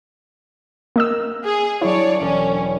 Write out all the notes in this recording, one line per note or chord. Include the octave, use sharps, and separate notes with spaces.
A#3 D#5 E6
G#4
F#3 D4 E4 C#5 D5
E1 C#4 D5